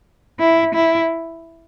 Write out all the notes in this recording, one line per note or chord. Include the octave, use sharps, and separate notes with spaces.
E4
E4